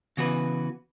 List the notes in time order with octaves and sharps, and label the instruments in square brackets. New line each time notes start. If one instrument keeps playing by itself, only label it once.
[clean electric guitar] C#3 E3 B3 F#4 B4